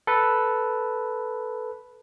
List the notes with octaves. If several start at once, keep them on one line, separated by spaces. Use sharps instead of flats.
A4 B4